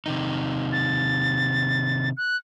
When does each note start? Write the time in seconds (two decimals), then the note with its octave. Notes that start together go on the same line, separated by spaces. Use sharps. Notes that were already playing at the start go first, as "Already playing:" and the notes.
0.06 C3 D#3 D#4
0.72 A6
2.17 F#6